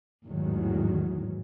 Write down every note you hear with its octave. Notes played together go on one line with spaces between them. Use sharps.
A1 E2 G#2 D#3 F#3